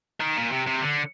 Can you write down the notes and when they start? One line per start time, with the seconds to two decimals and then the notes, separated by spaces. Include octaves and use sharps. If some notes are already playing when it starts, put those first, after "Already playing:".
0.20 D#3
0.37 A#2
0.52 C3
0.67 C3
0.81 D3